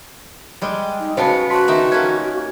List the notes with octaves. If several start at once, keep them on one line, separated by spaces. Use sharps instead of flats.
G3 G#3
D#4
C#3 B3 F#4 C5 A5 C#7
F#4 A5 C6 B6
D#3 D#4 E5
A#3 C#4 G#6